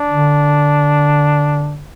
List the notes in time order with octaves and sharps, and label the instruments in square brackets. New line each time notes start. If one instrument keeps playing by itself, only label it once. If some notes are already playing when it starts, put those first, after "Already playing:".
Already playing: [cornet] D4
[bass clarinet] D3